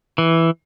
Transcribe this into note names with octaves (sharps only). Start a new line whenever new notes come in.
E3